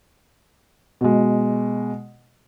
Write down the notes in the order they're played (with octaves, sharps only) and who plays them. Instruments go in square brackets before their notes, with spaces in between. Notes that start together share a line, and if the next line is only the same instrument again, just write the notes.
[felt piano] B2 G#3